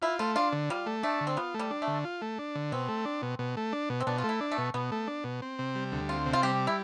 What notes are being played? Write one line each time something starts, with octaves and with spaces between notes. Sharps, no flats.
E4 F4
A3 F4
D4 F4
D3
G3 F4
A3
A3 D4
D3
C4
B3 F4
A3
G3
D4
A3
D3
F4
A3
D4
D3
B2 C4
A3
D4
B2
B2
A3
D4
B2
C4
B2 D4
F4
A3
E4
D4
A3
B2
B2 B3
A3
D4
B2
C4
C3
G3
D2
C4 F4
C3
F4
G3 G4
E4